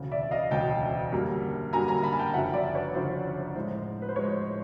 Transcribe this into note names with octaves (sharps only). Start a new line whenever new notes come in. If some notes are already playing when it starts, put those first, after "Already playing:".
Already playing: E1 D2 C#3
D5 E5
D#5 F5
E1 D2 C#3 G5 A5
F#2 D3 G3 A#3
F#2 D3 G3 A#3 G#5 A#5
G#5 A#5
A5 B5
G#5
G5 A5
F#1 F#2 D3 F3 E5 F#5
D5 E5
B4 C#5
F#1 F#2 D3 F3 C5
A2 F3 G#3 C5
B4
C5
A2 F3 G#3 B4 C#5
C5